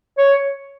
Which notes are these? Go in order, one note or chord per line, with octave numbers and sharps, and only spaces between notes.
C#5